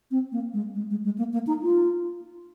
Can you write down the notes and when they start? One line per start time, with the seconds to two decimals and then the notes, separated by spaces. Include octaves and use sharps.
0.11 C4
0.32 A#3
0.54 G#3
0.75 G#3
0.91 G#3
1.05 G#3
1.18 A#3
1.33 A#3
1.47 D#4
1.63 F4